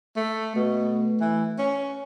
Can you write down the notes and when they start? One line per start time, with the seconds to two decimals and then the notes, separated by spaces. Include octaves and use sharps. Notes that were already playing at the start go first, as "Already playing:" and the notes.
0.17 A3
0.55 B2 A3
1.21 E3
1.59 C#4